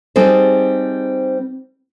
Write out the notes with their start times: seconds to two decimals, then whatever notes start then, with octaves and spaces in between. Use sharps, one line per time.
0.16 G3 C4 D#4 G#4 A4 C5